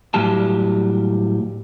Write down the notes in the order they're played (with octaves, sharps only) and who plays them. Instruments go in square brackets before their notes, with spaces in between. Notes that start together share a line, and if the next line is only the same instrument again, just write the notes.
[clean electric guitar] A2 F#3 G3 G4 A5